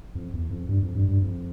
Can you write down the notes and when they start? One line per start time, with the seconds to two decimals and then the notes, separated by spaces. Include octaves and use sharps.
0.15 F2
0.33 E2
0.50 F2
0.69 G2
0.82 F2
0.95 G2
1.09 G2
1.22 F2